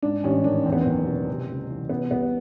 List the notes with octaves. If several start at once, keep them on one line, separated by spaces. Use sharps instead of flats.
G#2 D4
A1 C#4
D#3 D4
E2 C4
B3
F#1 C4
B2
C3
C#2
E3
C3 B3
C2 B3